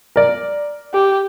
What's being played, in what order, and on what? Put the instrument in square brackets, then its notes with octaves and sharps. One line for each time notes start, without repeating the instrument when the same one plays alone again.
[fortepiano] A#4 D5
[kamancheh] G4